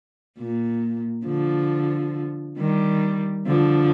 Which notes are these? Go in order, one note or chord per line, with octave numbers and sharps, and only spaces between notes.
A#2
D3 F3
D#3 G3
D3 F3